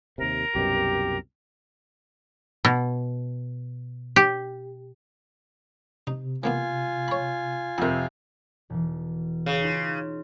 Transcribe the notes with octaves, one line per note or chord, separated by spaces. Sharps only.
D#2 C3 A#4
C2 F#2 B2 G4
B2
G4
C3 D#4
E3 A#3 B3 F4 G#5
C#5 B5
F2 C3 A#4 F#5
E1 E3
C#3
D#4 F4 C6